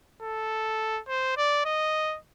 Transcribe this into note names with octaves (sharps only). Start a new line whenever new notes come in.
A4
C5
D5
D#5